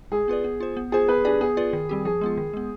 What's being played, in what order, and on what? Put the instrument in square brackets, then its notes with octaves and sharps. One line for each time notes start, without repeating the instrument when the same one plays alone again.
[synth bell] G#3 [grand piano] G#4
[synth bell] B3 F4 B4 D5
B3
F4 C5
B3
[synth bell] F4 C5 [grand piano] G#4
[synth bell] B3 [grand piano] B4
[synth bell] D4 G4 D5 [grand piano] G#4
[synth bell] B3 [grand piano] G#4
[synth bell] F4 B4 D5
D#3
G3 C4 G4
[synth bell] F3 [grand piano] G#4
[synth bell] G#3 B3 F4
D#3
G#3 B3